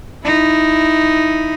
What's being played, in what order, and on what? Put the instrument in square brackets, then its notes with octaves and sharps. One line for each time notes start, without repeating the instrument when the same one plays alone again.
[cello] D#4 E4